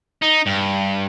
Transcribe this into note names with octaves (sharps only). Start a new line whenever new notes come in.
D#4
G2